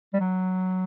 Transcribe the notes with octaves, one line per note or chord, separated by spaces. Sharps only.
G3
F#3